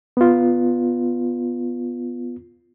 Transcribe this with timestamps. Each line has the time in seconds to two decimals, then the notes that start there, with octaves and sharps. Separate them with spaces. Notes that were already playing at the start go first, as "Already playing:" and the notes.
0.17 B3 F4